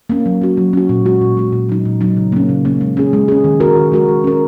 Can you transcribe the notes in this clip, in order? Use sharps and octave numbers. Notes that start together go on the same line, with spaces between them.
A#3 C#4
F#3
C#4 F#4
F#3
C#4 F#4
A#2
G#3 F#4
A#2
G#3 F#4
A#2
F#3 D#4
A#2
F#3 D#4
C#3
A#3 C#4
C#3
A#3 C#4
G#3
C#4 G#4
G#3
C#4 G#4
D#3
G#3 F#4 A#4
D#3
G#3 F#4 A#4
G#3
C#4 A#4